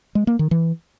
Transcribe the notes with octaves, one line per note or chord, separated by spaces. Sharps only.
G#3
A#3
D#3
E3